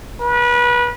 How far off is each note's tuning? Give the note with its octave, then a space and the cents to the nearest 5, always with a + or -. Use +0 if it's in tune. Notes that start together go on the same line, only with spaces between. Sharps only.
B4 -30